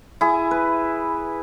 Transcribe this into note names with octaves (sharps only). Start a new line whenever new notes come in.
E4 G#4
B4